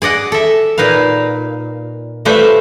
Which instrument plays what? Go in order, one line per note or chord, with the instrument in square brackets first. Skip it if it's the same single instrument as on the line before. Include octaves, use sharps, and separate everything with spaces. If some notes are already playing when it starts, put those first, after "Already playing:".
[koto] G#4 D5 D#5 F#5
A4 E5
A#2 D#4 B4 F5
G3 A3 F4 B4 C5 E5